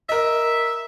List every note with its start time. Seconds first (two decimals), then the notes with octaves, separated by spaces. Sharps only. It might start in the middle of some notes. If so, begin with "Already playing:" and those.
0.09 A#4 D#5 E5